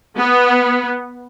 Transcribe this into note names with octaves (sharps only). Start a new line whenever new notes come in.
B3